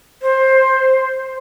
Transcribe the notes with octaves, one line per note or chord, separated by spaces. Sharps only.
C5